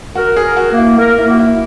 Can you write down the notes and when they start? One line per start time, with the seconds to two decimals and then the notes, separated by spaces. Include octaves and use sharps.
0.15 F#4 A#4
0.37 G#4
0.44 A#4
0.57 F#4
0.71 A#3
0.78 E4
0.98 A#4
1.18 E4
1.25 A#3 F#4
1.39 E4